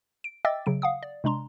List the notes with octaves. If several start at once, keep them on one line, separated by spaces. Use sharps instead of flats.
D7
D#5 E5 G5 D6 E6 A6
C#3 F#3 D7
F5 F#5 D#6
D5
C3 G#3 D4 A#5 C6